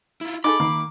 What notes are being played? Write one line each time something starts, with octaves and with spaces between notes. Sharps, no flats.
E4 F4
D#4 G#4 A4 B5 D6
D#3 A#3